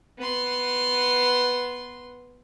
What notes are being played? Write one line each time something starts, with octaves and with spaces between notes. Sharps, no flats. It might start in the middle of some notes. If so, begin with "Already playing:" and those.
B3 C6